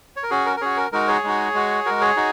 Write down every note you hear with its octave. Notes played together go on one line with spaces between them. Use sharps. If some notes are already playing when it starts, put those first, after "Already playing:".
C#5
A#4
C#4 F#4 G#4
A#4
A#4
C#4 F#4 G#4 C#5
A#4
G#3 D#4 F#4 A#4
G#4 C#5
G#3 D#4 F#4
G#3 F#4
G#3 F#4 A#4
G#4 C#5
D#4 F#4